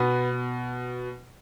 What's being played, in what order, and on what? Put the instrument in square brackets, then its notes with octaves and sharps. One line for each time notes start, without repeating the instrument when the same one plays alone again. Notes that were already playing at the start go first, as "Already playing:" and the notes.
Already playing: [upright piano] B2 B3